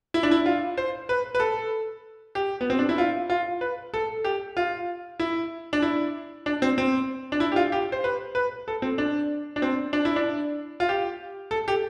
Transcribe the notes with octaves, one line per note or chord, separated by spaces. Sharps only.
E4
D4
E4
F4
C5
B4
B4
A4
G4
B3
C4
D4
E4
F4
F4
B4
A4
G4
F4
E4
D4
E4
D4
C4
C4
D4
E4
G4
F4
G4
C5
B4
B4
A4
C4
D4
D4
C4
D4
E4
D4
F4
G4
A4
G4